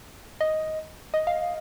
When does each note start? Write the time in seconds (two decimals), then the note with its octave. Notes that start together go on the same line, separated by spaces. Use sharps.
0.41 D#5
1.14 D#5
1.27 F5